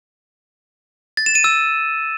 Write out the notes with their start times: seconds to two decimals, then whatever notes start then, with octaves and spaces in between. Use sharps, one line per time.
1.17 A6
1.26 E7
1.35 D#7
1.44 E6